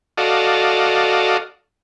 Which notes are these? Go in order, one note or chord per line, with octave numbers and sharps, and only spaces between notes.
F#4 A4 D5 D#5 F5